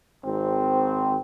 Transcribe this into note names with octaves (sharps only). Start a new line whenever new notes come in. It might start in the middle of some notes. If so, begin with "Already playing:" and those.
G#1 C4